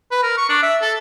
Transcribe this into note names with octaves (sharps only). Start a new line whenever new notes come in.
B4
A#4
C#6
D4
E5
A4